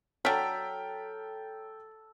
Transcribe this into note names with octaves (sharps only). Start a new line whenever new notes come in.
F#3 D4 A4 C#5 G5 A#5 F6 B6